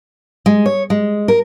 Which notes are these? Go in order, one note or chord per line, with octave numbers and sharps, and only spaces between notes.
G#3
C#5
G#3
A#4